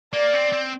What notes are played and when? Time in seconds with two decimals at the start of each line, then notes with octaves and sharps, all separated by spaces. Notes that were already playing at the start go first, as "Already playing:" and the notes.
0.13 A#3 D5
0.34 C4
0.53 C4